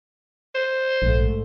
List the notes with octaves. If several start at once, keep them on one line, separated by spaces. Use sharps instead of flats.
C5
A#1 G#2 A3